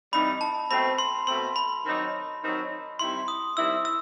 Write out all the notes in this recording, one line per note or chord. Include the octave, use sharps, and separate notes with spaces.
C3 E3 G3 D#4 B5
A5
B2 A3 C4 B5
C6
B2 A3 C4 C6
B5
D#3 F#3 C4 D#4
D#3 F#3 C4 D#4
D#3 G3 C4 E4 C6
D#6
D#3 G3 C4 E4 E6
E6